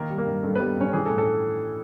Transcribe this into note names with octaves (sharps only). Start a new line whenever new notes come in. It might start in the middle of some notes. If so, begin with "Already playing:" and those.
Already playing: D#3 A#3 A#4
G3
A#3 A#4
G2
G2 A4
G3 B3 B4
G2 C#4 C#5
E3 G#4
A4
A2
A4